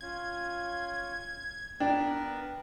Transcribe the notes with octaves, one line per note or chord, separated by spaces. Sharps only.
C#4 F4 G#6
B3 D4 A#4 B4 G5